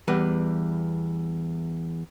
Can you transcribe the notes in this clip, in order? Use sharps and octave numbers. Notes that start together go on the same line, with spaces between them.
E2 G3 B4